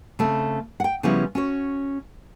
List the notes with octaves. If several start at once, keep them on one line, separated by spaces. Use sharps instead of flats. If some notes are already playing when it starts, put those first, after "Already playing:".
C#3 A3 C4
F#5 G5
C#3 F3 G3 B3 C#4 E4
C#4 F#4 C#5